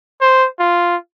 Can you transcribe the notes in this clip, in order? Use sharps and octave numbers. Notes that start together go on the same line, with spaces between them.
C5
F4